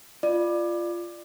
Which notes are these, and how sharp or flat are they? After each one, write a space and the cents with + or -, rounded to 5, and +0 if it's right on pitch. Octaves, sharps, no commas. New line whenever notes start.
F4 -15 D5 +20